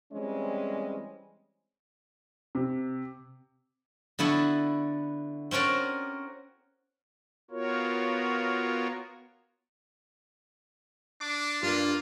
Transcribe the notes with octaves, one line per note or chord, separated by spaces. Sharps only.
E3 G3 G#3 C4 C#4
C3
D3 B3 E4 F#4 A4
C4 C#4 F#4 A#4 D5
B3 F4 F#4 A#4 C#5
D4 D6
G2 A#3 F4